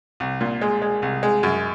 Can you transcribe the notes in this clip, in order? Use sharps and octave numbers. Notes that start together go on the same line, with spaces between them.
C2
A#2
G#3
G#3
C2
G#3
F#2